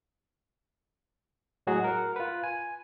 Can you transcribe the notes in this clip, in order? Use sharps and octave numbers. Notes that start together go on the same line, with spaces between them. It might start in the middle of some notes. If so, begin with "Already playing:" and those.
A2 F#3 G#3 F#4 G#4
A#4 F#5
F4 B4
G#5